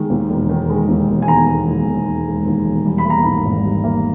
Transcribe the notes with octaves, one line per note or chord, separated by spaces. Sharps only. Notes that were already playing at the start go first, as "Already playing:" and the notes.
Already playing: D#3 G#3
D#2
E1
D#3
G#3
D#2
E1
G#5
D#3 A#5
G#3
D#2
E1
D#3
G#3
D#2
E1
G3
B5
A#3
A#5
G#2 B5
G#1
G3
A#3